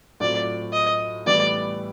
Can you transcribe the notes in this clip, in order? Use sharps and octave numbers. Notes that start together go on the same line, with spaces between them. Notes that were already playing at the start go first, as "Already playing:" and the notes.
A2 F#3 A3 C4 F4 D5
D#5
A2 E3 G3 B3 D5